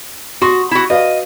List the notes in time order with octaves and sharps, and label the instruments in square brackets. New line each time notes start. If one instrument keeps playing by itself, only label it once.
[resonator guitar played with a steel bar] F#4 [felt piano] C6 D#6
[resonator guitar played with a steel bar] E4 F#4
[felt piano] F#4 B4 F5 [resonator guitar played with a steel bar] D#5